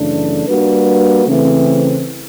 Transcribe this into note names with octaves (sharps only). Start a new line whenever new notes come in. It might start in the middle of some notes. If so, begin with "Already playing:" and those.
Already playing: F#2 C#3 E3 A3 D4
G3 A#3 D4 F#4 B4
C#3 E3 A3 C4